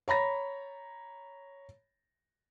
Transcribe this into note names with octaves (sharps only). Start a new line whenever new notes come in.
C#5 A#5 B5 A#6